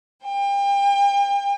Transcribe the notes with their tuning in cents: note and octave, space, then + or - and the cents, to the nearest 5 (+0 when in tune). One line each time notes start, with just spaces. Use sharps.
G5 +35